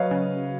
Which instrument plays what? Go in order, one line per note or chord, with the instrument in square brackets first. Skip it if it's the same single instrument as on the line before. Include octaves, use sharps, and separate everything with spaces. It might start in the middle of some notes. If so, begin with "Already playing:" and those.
Already playing: [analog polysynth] F#3 [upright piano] B4 C#5 D#5 F5
[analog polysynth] C#3